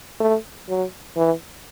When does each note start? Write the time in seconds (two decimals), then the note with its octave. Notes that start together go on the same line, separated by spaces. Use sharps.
0.20 A3
0.69 F#3
1.16 E3